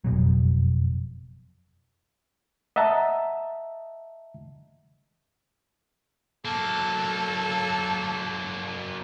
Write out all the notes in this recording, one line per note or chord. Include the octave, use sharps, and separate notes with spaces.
F#1 F2 B2 F#3
D#5 E5 F#5 A5 A#5
F#3 A#3 A4